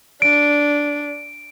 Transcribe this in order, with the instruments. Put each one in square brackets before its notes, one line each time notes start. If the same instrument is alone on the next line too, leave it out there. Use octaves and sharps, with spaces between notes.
[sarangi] D4 [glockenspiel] D7